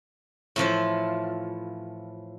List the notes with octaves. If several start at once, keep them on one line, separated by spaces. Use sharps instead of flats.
A2 E3 F3 F4